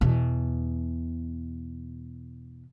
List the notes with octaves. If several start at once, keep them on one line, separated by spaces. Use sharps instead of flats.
E2 B2